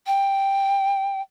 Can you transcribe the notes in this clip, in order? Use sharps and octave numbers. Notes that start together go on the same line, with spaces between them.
G5